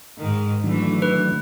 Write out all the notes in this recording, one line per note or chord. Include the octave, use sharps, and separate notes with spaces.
G#2 D#3
D#3 E3 F#3 A3 D4
B4